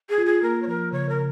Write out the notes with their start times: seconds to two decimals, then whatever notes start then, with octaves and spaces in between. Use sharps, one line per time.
0.09 G#4
0.18 F4
0.26 G#4
0.42 A#3 A#4
0.62 C#5
0.67 F3 A#4
0.92 C#3 C#5
1.09 A#4